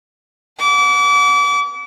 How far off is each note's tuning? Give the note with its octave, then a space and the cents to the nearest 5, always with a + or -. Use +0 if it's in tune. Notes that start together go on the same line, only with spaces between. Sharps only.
F#5 -15 D6 -35